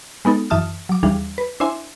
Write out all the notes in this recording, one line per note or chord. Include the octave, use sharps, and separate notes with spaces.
G#3 B3 D#4 A4
F#2 E3 E5 A5 D#6 F6
F#3 D6
D#2 E3 G3 D4 G#4 F5
B4
D4 E4 C5 E5 G#5 C6